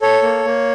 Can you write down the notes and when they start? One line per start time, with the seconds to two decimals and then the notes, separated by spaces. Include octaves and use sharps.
0.01 A4 C#5
0.23 A#3
0.45 A#3